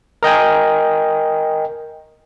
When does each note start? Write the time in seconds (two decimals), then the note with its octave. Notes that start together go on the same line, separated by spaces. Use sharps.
0.23 A#4 D#5 G5 G#5